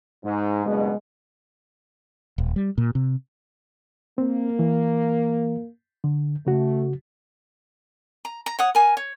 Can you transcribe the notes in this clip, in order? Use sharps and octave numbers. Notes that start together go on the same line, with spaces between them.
G#2
F#1 G2 B2 G#3
D#1
G3
A#2
C3
A#3 C4
E3
D3
C#3 A3 F#4
A#5
A#5
C#5 F#5 D#6
A#4 G#5
C#5